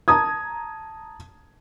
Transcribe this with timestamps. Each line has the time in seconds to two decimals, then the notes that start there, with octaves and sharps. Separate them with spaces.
0.08 A5 A#5 D#6 G#6